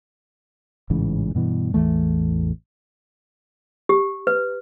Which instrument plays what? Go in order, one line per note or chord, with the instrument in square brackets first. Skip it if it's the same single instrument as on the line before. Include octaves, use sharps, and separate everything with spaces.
[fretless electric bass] A1 G#2 C#3 E3
G2 B2 E3
A1 E2 E3 A3
[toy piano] G4
B4